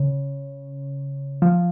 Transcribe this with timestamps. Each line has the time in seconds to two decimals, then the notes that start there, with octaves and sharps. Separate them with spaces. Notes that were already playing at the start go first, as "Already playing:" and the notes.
Already playing: C#3
1.42 F3